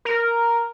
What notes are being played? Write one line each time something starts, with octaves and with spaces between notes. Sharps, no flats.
A#4